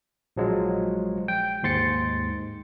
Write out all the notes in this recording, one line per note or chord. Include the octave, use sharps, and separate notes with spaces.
A#1 F3 F#3 G#3
G5
D#2 G#2 C6 A6 C#7